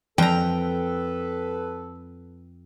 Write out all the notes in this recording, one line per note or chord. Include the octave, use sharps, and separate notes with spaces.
F2 A4 B4 G5 A#5